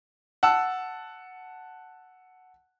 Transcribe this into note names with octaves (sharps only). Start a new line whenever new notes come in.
F#5 A5 E6